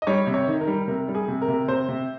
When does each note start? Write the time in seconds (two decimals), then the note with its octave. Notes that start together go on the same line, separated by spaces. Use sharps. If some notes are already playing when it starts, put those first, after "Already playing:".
0.02 D#5
0.07 G3 C#5
0.27 C3
0.34 C#5
0.47 D#3
0.61 A#4
0.67 G3
0.88 C3 A#4
1.08 G3
1.15 G#4
1.28 C3
1.42 A#4
1.48 C3
1.68 C3 C5
1.89 C3